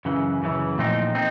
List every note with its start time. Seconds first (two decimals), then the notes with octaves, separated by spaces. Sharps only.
0.05 F#2 C#3 E3
0.42 F#2 C#3 E3
0.78 A#2 F3 A3 C4 D#4
1.15 C4 D#4